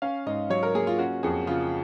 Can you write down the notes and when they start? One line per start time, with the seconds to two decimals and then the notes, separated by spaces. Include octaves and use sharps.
0.02 C#4 F5
0.26 G#2 D#5
0.50 F#3 C#5
0.63 A#4
0.74 A#3 G#4
0.87 F4
0.98 C#4 F#4
1.23 F2 G#4
1.47 C#3 F4